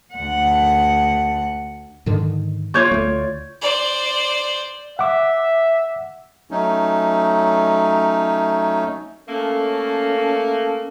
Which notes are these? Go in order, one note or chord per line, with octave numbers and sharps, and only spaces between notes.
D2 F#5
G#2 D3 D#3
F4 C#5 D5 C#6 G6 G#6
D2 A3
C5 D5
E5 F#5 D6
F#3 A3 C#4 D#4
A3 A#3 C#4 A4